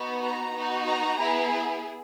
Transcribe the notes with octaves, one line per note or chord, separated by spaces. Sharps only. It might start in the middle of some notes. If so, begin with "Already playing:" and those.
Already playing: B3 D#4 F#4
A#5
B3 D#4 F#4
A#5
B3 E4 G#4